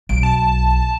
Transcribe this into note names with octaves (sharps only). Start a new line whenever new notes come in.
B1 D7
A5